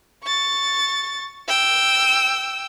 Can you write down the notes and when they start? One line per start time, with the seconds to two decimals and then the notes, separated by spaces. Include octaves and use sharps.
0.24 C#6 A6
1.48 G5 E6